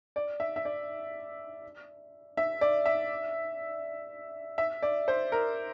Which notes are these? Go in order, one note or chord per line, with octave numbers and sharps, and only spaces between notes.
D5
E5
E5
D5
E5
D5
E5
E5
D5
C5
A#4